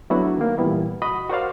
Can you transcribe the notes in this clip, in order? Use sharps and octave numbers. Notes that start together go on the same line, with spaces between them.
F#3 A3 B3 D4 E4 F#4
D#3 A#3
A#2 E3 G3 B3 E4
F#4 D#5 B5 D#6
F#4 A#4 C5 D5 F5